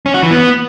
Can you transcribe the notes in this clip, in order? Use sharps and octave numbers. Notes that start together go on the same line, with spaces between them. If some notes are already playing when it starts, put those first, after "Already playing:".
C#4
F#4
E3
B3